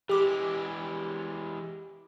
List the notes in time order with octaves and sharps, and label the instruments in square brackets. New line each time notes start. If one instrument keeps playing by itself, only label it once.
[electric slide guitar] E3 G#3 [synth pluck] G4 D6